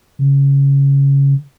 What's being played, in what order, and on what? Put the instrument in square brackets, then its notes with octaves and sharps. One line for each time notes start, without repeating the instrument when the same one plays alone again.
[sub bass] C#3